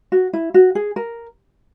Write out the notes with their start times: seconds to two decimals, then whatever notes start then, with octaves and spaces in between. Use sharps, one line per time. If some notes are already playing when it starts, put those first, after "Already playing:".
0.12 F#4
0.33 E4
0.54 F#4
0.75 G#4
0.96 A#4